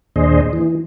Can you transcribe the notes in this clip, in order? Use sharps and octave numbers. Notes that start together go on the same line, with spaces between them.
D#2 A#2 D4 G#4 C5 D#5
E3